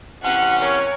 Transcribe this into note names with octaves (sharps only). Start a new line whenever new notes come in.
C3 E3 C#4 F#5
A#4 C#5